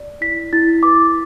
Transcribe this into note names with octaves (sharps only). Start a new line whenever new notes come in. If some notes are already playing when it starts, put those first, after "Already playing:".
Already playing: D5
E4 B6
E4 A6
B4 D6